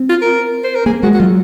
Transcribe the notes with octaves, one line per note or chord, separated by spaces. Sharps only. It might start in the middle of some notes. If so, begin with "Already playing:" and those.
Already playing: C4
F4
A#4
C5
A#4
A#3 G#4
G#3 F#4
F#4
F#3 F4